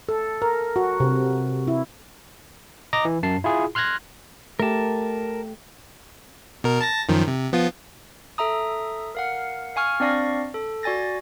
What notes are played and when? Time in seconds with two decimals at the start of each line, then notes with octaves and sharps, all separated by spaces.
0.09 A4
0.42 A#4
0.76 F#4
1.00 C3
1.67 E4
2.93 D#5 A#5 D6 A#6
3.05 E3
3.23 F#2 A5 C7
3.44 E4 F4 G#4
3.75 C6 F6 F#6 G#6 A#6
4.60 A3 G4 A#4 A5
6.64 B2 A#4
6.81 A5 A6 A#6
7.09 F#2 D#3 F3
7.28 C3
7.52 F3 B3 F4
8.38 A4 E5 A#5 D#6
9.15 A#4 F5 F#5
9.76 F5 G#5 C#6 F6
10.00 C4 D4 D5 F5 C#6 A#6
10.54 A4
10.83 F#4 D5 G#5 A6 A#6